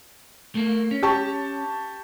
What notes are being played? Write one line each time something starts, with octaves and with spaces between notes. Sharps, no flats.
A3 A#3
C#4
G4 A5 C#6